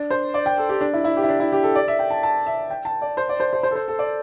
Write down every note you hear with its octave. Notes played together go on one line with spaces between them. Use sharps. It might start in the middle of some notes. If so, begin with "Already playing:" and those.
Already playing: D4
C5
D5
G5
A4
G4
D4
E4
E4
G4
E4
D4
E4
G4
A4
D5
E5
G5
A5
A5
E5
G5
A5
D5
C5
D5
C5
C5
C5
A4
C5
A4
D5